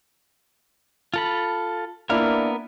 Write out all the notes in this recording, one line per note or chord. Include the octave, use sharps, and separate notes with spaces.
F4 A4 B5
A#3 B3 D4 E4 A#4 F6